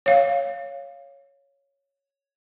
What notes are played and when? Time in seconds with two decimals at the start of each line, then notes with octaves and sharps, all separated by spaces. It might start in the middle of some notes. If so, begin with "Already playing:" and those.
0.06 C#5 F5